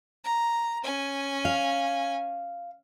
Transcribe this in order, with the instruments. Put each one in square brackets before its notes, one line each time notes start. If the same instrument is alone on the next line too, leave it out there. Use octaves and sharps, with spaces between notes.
[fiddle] A#5
C#4 G#5
[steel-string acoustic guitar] F5